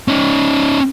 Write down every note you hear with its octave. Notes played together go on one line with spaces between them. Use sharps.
C#4 D#4